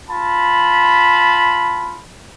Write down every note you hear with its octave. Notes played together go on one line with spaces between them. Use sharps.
F4 A5 B5